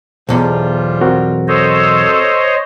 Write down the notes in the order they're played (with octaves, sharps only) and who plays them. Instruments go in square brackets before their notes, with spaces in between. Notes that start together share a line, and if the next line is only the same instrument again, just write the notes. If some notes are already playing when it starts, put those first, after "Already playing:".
[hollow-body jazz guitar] B1 E2 [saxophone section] F3 G3 F4
[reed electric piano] C4 F#4 A#4
[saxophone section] A4 [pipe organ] C5 C#5 D#5